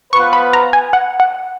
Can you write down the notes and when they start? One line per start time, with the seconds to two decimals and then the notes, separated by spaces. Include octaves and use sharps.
0.13 F3 B3 F4 B4 C#6
0.33 B5
0.53 A#5
0.73 G#5
0.93 F#5
1.20 F#5